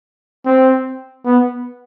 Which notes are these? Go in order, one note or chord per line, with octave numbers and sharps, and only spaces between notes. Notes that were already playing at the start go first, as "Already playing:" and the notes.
C4
B3